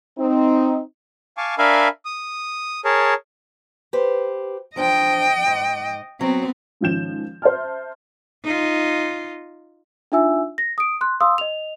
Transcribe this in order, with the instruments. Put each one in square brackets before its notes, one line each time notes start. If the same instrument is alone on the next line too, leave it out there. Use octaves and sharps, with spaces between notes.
[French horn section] C4 D#4
[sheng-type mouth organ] F5 G#5 A5 C#6 D6
D4 A#4 E5 F5 G#5 B5
D#6
G#4 A#4 C#5 A5
[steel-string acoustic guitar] G4 B4 C5
[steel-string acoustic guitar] F3 D4 C5 [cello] D#5 G5
[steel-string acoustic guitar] G#2
[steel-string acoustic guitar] F#3 [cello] B3 C4
[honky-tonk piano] G#2 D#3 F3 C#4 G6 E7
C5 E5 A5 F6
[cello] D#4 F4
[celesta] D4 D#4 F4 E5 G#5 E6
A#6
D#6 D7
C6 F#6
F5 C6 D#6 E6
D#5 F7